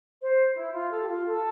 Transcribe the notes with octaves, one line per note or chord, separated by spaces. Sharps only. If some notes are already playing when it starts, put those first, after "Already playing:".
C5
E4
F4
A4
G4
F4
A4